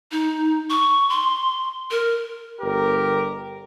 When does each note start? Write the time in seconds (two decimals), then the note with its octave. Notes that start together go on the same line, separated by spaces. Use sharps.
0.12 D#4
0.70 C#6
1.09 C6
1.91 A#4
2.61 G1 G4 A#4